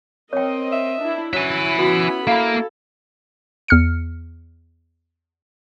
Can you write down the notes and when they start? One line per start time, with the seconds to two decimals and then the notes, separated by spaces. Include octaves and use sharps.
0.33 C4 A#4 C#5 D#5 G5
0.72 E5
1.01 D4 E4
1.33 F#3 C#4 E4 E5 G#5 B5
1.79 B3 F#4
2.27 A#3 E4 A4 F5 B5
3.68 E2 F6 C#7